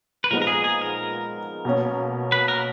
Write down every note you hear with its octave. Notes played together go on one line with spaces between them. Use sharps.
B4
A#2 F3 G#3 B3 D#4 A#4
A#4
G#4
G#4
A#4
B2 A#3 C#4
B4
A#4